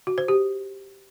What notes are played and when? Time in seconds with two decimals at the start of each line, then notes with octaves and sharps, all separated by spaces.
0.07 F#4
0.18 C5
0.28 G4